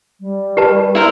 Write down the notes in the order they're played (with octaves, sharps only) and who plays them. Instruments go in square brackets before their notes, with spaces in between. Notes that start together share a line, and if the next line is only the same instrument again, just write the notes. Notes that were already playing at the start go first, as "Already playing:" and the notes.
[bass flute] G3
[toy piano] G4 B4 A5
[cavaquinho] E4 A#4 C5